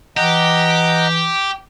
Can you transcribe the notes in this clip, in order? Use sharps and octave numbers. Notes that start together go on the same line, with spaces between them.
E3 G4 D#5 F#5 A#5